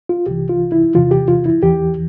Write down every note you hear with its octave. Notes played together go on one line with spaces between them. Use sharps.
F4
C2 C3 E3 G4
F4
E4
E2 C3 E3 F4
G4
F4
E4
E2 E3 G4